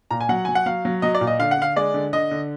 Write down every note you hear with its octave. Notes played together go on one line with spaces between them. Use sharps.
A#2 A#5
G#5
F#3 F#5
F#3 G#5
F#5
F#3 F5
F#3
F#3 D#5
D5
A#2
D#5
D3 F5
F#5
D3 F5
G#3 D5
D3
D3 D#5
D3